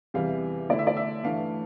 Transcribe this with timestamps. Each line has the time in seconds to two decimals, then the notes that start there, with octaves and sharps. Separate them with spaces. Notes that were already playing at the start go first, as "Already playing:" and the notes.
0.14 E2 C3 E3 G3 F5
0.69 D3 A3 E4 D5
0.79 E5
0.87 D5
0.97 E5
1.24 G2 E3 A3 F5